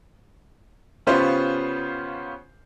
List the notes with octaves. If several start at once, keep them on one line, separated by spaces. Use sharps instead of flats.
C#3 B3 C#4 F4 G4 C5